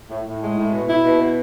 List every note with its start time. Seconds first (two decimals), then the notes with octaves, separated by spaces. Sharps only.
0.10 A2
0.25 A2
0.42 G#3
0.57 A2
0.72 B2
0.88 E4
1.04 B2
1.20 B2